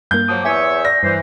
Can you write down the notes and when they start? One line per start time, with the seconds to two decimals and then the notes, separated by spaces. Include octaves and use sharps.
0.11 G2 A#3 G6
0.28 F3 F#3 A#3 D6 D#6
0.45 E2 C#5 E5 G#5 D#6
0.85 D5 A#6
1.03 G2 E3 C5